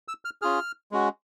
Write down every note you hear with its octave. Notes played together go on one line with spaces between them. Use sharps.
E6
F6
C#4 F4 G#4 F6
G#3 C#4 F#4